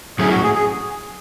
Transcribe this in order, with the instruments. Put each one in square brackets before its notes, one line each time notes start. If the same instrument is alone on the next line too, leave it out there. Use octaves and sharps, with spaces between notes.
[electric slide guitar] A2 F#3 A3 C#4 E4 [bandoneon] G#4
[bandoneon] F#4
G#4
G#4